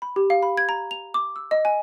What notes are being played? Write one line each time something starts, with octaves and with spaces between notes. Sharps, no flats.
B5
G4
F5
B5
G#6
A#5
F7
D6
E6
D#5
G#5